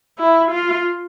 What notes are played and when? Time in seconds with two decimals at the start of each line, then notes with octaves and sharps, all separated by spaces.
0.18 E4
0.51 F4